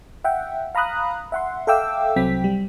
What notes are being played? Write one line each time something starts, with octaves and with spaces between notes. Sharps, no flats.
E5 F#5 G5
F5 A#5 B5 D#6 F#6
E5 F#5 C6
A4 E5 F5 G5 D6 E6
C2 F#3 C4 G5 B6
G3